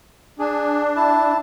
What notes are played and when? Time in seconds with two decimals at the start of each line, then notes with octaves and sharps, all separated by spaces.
0.39 D4 G#4
0.96 E4 A5